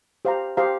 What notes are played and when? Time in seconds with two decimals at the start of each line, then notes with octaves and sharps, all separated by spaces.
0.25 G4 C5 F5 A#5
0.57 G4 C5 F5 A#5